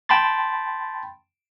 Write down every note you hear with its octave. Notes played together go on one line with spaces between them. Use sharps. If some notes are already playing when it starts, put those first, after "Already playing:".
G5 A5 B5 C6 A6